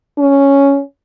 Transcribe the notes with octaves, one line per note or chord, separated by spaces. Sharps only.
C#4